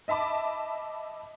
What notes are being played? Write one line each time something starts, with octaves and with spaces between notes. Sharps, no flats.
D#5 E5 A5 B5 D6